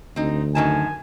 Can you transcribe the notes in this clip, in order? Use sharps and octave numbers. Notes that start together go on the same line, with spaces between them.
D2 C4 D#4
F#2 D#3 G#5 A5